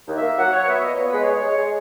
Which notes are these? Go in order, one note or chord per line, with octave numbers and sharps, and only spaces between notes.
D#2
E5
A#3
F#3 F#5
F#3 C#5
B3 E5
A#2 D#5
B3 C#5
G#3 B4
C#5
G#3
G#3
G#3